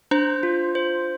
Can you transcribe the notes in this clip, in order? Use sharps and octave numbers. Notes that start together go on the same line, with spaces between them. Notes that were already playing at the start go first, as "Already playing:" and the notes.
D4 C5
F4
C5